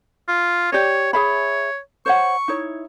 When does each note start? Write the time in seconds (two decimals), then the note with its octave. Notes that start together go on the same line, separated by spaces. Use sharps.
0.28 F4
0.72 G4 C#5 D5
1.13 G#4 C#5 E5 B5
2.06 C5 C#5 F#5 C#6
2.48 D#4 E4 C#5